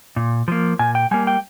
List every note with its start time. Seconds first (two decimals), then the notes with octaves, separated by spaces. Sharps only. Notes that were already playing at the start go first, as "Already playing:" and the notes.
0.16 A#2
0.48 F3 A#3
0.79 A#2 G#5
0.95 G5
1.11 G3 A#3 G#5
1.27 G5